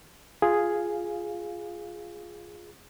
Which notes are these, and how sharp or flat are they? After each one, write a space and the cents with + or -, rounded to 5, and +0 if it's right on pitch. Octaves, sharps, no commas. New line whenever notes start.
F4 +0 G#4 +0 F5 +0